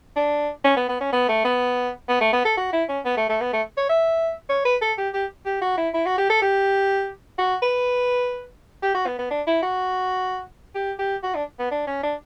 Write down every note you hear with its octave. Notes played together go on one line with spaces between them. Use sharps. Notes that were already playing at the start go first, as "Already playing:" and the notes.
D4
C#4
B3
B3
C#4
B3
A3
B3
B3
A3
B3
A4
F#4
E4
C#4
B3
A3
A3
B3
A3
C#5
E5
C#5
B4
A4
G4
G4
G4
F#4
E4
E4
F#4
G4
A4
G4
F#4
B4
G4
F#4
B3
B3
D4
E4
F#4
G4
G4
F#4
D4
B3
D4
C#4
D4